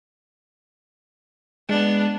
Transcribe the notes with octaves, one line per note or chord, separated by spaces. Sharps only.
G#3 B3 D4